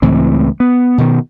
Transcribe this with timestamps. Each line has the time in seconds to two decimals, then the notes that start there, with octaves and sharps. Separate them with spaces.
0.02 C#2 A2 E3 C4
0.60 B3
0.98 B2 D#3